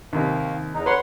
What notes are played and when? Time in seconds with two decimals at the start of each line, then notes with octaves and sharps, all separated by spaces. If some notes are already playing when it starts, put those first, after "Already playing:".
0.13 D#2 C3 D#3 A#3
0.74 E2 D#4
0.86 B4 C#5 F#5 C6